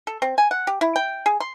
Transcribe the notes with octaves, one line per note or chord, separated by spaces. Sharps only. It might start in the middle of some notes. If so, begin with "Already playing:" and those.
A4
C4
G#5
F#5
G4
E4
G5
G#4
C6